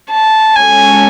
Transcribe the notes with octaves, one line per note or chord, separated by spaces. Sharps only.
A5
G#3 C#4 F#4 A4 C#5 G#5